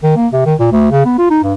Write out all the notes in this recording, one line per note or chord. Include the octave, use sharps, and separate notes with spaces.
D#3
A#3
C3
D#3
A#2
D2
C#3
B3
F4
D#4
G2